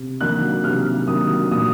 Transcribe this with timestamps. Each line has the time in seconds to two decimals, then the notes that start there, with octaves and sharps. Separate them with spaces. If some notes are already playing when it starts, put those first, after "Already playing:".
Already playing: C3
0.20 D#3 F#3 A#3 D4 F#6
0.64 C3 F6
1.07 D#3 F#3 A#3 D4 D#6
1.51 A#2 D#6